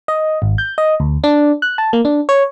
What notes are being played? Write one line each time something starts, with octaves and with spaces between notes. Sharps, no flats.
D#5
G#1
G6
D#5
D2
D4
F#6
A5
A#3
D4
C#5